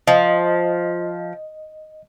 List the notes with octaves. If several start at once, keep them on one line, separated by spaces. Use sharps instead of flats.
F3 D#5